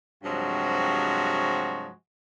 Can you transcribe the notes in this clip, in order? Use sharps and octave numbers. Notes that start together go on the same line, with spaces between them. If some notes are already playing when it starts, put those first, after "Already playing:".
G2 C3 F3 F#3 G#3 F#4